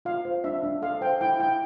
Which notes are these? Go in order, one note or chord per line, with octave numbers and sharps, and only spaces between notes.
F4 F5
C5
D4 E5
D4
A4 F5
C5 G5
E4 G5
E4 G5